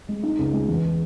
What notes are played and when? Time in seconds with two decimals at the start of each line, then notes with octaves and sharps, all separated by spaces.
0.09 G#3
0.23 D#4
0.39 C#2
0.53 G#3
0.68 E2